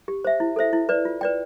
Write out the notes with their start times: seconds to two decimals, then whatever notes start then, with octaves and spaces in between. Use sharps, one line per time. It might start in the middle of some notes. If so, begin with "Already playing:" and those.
0.08 G4
0.25 C5 E5
0.40 E4
0.56 A4 C5 E5
0.73 E4
0.89 B4 D5
1.05 F4
1.21 B4 D5 G5